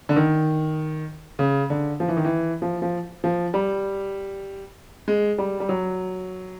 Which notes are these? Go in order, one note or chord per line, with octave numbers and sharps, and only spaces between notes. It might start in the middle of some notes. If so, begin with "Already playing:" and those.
D3
D#3
C#3
D3
F3
E3
D#3
E3
F3
F3
F3
G3
G#3
G3
G3
F#3